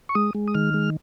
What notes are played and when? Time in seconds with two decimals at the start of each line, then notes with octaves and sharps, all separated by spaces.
0.09 C#6
0.15 G#3 D#6
0.35 G#3
0.47 D#6
0.54 D#3 F6
0.74 G#3